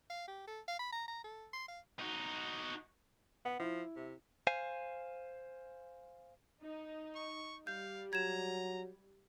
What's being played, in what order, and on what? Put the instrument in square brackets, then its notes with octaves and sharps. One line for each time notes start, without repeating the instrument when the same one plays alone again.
[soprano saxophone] F5
G4
A4
F5
B5
A#5
A#5
A4
C6
F5
[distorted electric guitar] D#4 F#4
[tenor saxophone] B3 [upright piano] F#5
[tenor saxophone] F3 [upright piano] E4
[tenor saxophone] C3
[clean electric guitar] C5 F5 G#5
[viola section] D#4
[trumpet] C#6
[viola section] G3 [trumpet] F5 [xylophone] G6
[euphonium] F#3 [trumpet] A#5 [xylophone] G#6 E7